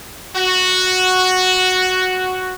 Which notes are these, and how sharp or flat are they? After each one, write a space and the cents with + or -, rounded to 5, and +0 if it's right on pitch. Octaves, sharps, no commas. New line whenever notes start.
F#4 +0